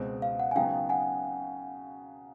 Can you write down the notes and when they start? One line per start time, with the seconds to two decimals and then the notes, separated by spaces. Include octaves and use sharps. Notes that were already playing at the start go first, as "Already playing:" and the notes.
Already playing: C#2 B2 G#3 C4
0.22 F5
0.40 F#5
0.51 G#5
0.56 C#3 F#3 B3 D#4 F5 G5
0.89 F#5 G#5